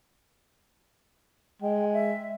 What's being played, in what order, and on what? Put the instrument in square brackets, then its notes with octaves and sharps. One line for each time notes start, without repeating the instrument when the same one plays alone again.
[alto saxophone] G#3 [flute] G5
[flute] E5